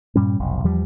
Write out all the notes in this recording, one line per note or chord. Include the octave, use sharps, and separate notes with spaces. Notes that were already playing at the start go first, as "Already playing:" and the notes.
G2 A#2 G3 C#4
F1 B1
E2 F3 G3